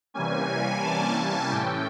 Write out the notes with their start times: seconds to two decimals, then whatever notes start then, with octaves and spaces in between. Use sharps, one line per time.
0.14 C3 E3 G3 A#3 C#4 G#5
0.83 A5
1.18 G#5
1.51 A2 E3 A3 C#4 G5